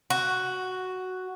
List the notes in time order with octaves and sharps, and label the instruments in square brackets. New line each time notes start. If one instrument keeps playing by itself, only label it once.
[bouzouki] F#4